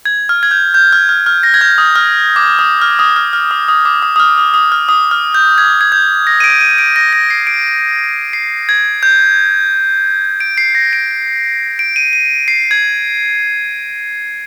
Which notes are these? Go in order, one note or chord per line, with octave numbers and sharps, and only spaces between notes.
G#6
F6
G#6
G6
G6
F6
F6
F6
A#6
G#6
G6
D#6
F6
D6
D#6
F6
D#6
F6
F6
D#6
D#6
D6
D#6
D#6
F6
D#6
D#6
F6
D#6
F6
G6
G#6
G#6
G6
A#6
D#7
D7
D#7
D7
A#6
A#6
C7
D7
C7
G#6
G6
D7
C7
A#6
D7
D7
D#7
D#7
C7
G#6